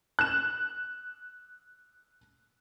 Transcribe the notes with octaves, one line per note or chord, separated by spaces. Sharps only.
F#6 E7